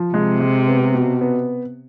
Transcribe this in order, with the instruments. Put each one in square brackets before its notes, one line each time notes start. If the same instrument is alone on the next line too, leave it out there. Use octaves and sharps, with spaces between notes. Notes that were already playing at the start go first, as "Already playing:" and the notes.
Already playing: [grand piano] F3
[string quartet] C3 [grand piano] G#3
[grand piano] G#3
B3
B2
B3